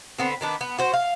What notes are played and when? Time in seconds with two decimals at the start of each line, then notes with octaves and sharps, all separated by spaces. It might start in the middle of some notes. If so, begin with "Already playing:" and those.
0.18 D3 B3 C4
0.41 D#3 B3 D4
0.61 B3
0.79 F#4 C5
0.94 F5